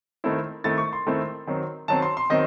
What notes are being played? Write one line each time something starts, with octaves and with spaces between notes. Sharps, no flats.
D#3 A3 C4 E4
D#3 A3 C4 E4 A6
C#6
C6
D#3 A3 C4 E4
D#3 F#3 C4
D#3 F#3 C4 A5
C6
C6
D#3 F#3 C4 D#5